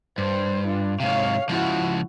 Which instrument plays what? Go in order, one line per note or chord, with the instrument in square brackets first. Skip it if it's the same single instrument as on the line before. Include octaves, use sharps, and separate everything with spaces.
[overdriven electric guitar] G2 [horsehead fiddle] C5
[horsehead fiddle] D4 F4
[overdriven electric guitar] G#2 C3 [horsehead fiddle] C#5 F5
[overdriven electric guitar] C#2 F3 [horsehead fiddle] E4 F#4